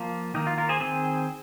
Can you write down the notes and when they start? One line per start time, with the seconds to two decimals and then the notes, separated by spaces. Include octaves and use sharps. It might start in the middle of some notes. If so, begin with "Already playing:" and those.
Already playing: F3 A#3 F4
0.34 D#3 A#3 D#4
0.47 F4
0.58 F4 A#4
0.69 G#4 C5
0.80 D#3 C4 G#4 C5